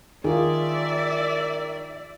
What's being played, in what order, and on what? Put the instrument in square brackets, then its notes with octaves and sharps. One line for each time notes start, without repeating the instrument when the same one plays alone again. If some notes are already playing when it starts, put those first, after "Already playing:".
[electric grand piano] D#3 [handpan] F4 G#4 [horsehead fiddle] D5 E5